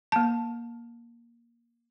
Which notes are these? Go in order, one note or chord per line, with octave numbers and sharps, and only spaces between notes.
A#3 A5